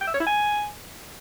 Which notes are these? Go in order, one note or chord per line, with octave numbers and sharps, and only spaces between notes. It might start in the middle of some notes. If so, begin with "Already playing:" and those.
G5
E5
C#5
E4
G#5